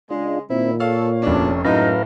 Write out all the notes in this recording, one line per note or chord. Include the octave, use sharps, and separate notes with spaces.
C#3 G#3 D4 F4
A#2 D#3 C4 E4
A4 C#5 F5
F1 B2 C#4 D4
F#2 A2 G#3 D#4 B4 F5 A#5